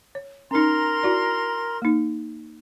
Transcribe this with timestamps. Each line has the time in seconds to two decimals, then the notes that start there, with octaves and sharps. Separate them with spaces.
0.15 C#5
0.51 C#4 D#4 A#4 A#5 C6
1.03 E4 F#4 D5
1.82 A#3 D#4